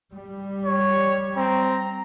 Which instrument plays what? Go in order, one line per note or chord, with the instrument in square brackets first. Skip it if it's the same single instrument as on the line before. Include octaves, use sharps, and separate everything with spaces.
[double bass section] G3
[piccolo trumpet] C#5
[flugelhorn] C4 [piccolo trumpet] A#5